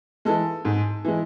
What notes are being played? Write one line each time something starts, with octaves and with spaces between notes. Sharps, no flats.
E3 G#3 A4
G#2
E3 G#3